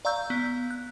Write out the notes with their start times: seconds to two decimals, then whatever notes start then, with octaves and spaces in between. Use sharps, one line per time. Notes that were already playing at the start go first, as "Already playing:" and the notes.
0.05 D5 F5 A#5 C#6 E6 G6
0.30 B3
0.71 F#6